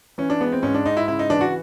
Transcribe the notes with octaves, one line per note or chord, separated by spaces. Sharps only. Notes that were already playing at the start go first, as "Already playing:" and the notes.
E3 C#4
D4
G#3 B3
C4
G#2 C#4
D4
G#2 D#4
E4
C#3 E4
D#4
E3 D4
F#4